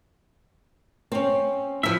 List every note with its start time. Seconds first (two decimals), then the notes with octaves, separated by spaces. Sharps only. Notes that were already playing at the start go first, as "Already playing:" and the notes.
1.12 C4 C#4
1.83 F3 E4 E5